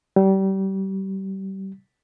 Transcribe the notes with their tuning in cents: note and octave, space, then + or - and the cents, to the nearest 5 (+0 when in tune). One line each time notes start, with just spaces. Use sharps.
G3 -30